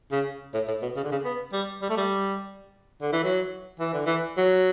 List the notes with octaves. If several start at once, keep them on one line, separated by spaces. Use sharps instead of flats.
C#3
A2
A2
B2
C#3
D3
C#3
B3
G3
G3
A3
G3
D3
E3
F#3
E3
D3
E3
F#3